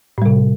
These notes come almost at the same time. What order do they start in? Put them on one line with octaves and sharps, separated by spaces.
A2 G3 C3